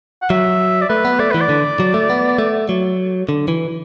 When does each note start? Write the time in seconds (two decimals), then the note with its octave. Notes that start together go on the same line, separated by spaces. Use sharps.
0.22 F#5
0.30 F#3 E5
0.82 D5
0.90 A3 B4
1.05 B3
1.19 A3 D5
1.31 E3 B4
1.41 D5
1.49 D3
1.80 F#3
1.94 A3
2.10 B3
2.38 A3
2.69 F#3
3.29 D3
3.48 E3